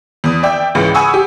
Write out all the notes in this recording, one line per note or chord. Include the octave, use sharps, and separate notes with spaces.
E2 D#6
D5 E5 G5
C#2 G#2 C#3 E3
F#5 G#5 B5 C#6 D#6 E6
G4